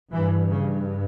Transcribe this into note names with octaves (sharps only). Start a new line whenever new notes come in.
G2 E3
C#3